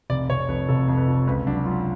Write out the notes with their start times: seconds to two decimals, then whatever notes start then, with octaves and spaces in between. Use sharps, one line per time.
0.10 F1 D5
0.29 F1 C#5
0.49 F2 B4
0.69 F1 A4
0.88 F2
0.97 B4
1.07 F3
1.27 C#2 B4
1.46 F#3 D4
1.65 F#3 F4